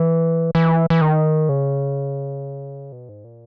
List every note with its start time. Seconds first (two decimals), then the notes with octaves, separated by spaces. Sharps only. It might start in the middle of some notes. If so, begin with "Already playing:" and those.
Already playing: E3
0.55 E3
0.90 E3
1.01 D#3
1.49 C#3
2.92 B2
3.09 G#2
3.24 A#2